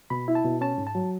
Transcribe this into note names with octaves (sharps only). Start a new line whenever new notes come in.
B2 B5
E4
A5
B2
C#4 A5
G#2
A5
F#3